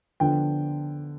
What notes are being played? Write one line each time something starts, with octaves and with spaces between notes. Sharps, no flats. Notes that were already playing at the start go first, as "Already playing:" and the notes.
D3 F3 B3 D4 G5